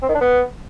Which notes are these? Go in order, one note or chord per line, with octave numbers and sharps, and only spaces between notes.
C4
D#3
D4
B3